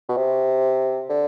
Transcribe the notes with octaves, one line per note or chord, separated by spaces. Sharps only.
B2
C3
D3